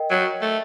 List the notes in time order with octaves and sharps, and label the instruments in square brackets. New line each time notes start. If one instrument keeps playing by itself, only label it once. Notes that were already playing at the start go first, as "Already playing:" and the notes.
Already playing: [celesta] A#4 D#5 G5
[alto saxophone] F#3
A3